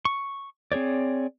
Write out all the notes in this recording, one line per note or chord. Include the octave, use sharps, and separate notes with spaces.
C#6
C4 G#4 C#5 D5